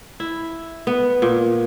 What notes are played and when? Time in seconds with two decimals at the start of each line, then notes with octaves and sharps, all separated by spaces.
0.20 E4
0.87 B3
1.22 A#2